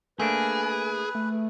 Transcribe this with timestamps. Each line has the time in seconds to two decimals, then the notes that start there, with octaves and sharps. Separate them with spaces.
0.20 A3 A#3 D4 G#4 B4
1.15 A3